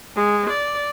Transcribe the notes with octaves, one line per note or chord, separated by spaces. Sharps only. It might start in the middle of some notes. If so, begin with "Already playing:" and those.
G#3
D5